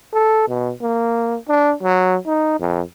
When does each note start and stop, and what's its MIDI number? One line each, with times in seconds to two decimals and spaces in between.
0.14 0.47 69
0.48 0.72 47
0.82 1.37 58
1.48 1.74 62
1.83 2.17 54
2.27 2.58 63
2.60 2.81 41